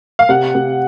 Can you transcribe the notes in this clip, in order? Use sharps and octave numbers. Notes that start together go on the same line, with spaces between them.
F5
C3 F#5
C3